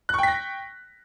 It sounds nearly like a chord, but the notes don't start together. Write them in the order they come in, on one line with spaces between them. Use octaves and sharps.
F#6 C#6 G5 B6 A#6